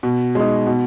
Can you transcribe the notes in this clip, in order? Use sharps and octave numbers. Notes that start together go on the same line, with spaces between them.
B2
G#3 D#4
B2